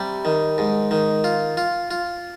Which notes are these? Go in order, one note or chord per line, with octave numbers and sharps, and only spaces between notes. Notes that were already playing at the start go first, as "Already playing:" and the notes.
Already playing: C3 G3
D#3
G#2
D#3
F4
F4
F4